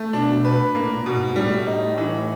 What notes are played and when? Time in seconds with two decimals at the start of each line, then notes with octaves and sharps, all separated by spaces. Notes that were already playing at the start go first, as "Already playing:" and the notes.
Already playing: A3
0.13 B2 D4
0.45 B4
0.74 A2 A#3
0.95 A#2
1.06 B2
1.16 G#2
1.35 A2 G3
1.67 D#4
1.98 E3